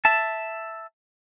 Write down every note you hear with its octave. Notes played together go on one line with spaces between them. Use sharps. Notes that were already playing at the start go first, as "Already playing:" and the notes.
E5 A5